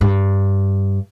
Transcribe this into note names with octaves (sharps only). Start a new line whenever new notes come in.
G2